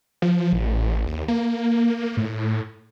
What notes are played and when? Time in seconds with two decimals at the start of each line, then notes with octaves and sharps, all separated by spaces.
0.22 F3
0.53 A1
1.06 D#2
1.28 A#3
2.17 A2